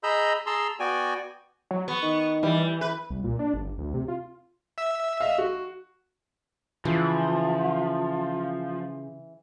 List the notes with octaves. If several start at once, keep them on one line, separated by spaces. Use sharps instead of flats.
G#4 D#5 A#5 B5 E6 G6
G#4 A5 A#5 C6 E6
B3 F#4 D5 G5 G#5
F#3
B3 C#6
D#3
E3 G3
B4
C2
A#2
D4
G1
D2
C3
F4
E5 E6
D#5 F5
F#4
C#3 E3 F3